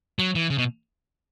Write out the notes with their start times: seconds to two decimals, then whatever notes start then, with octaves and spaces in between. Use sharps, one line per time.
0.19 F#3
0.35 E3
0.50 C#3
0.58 B2